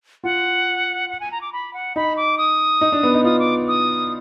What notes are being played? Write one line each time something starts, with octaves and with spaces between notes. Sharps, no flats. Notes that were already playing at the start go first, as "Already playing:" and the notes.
F4 F#5
F#5
G#5
A#5
D6
B5
F#5
D#4 B5
D6
D#6
D#4
D4
B3
D#4
F4 D#6
D6
D#6